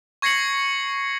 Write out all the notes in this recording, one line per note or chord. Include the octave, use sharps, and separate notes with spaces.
C#6 G#6 A#6 C7 C#7 F#7